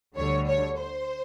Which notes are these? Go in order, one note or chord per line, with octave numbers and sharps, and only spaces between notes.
D2 D3 G3 C#5
C#5
C5